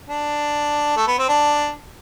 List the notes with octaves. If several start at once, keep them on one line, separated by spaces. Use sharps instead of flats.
D4
A3
B3
C4
D4